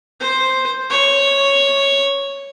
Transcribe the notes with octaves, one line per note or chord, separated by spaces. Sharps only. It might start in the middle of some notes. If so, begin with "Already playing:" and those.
C5
C#5